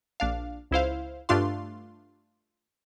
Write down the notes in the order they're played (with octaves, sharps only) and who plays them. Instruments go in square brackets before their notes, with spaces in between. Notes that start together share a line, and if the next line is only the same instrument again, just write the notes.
[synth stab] A#1 D4 F5
C#2 E4 C5 F5
G2 A3 D4 F4 F5 C6